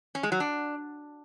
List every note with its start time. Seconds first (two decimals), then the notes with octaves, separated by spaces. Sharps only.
0.15 C#4
0.23 G#3
0.32 F#3
0.40 D4